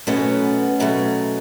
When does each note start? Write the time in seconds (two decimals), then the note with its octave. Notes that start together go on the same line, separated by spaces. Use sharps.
0.07 B2 F#3 A3 B3 C#4
0.80 B2 F#3 A3